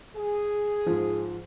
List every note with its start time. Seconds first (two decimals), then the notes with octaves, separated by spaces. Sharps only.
0.14 G#4
0.86 G#2 F3